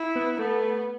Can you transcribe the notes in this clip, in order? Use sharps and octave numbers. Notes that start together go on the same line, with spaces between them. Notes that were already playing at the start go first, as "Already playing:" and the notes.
Already playing: E4
B3
A3 B3